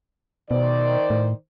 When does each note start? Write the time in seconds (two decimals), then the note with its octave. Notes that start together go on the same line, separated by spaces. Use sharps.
0.51 B2 D#3 C5 D5
1.10 A2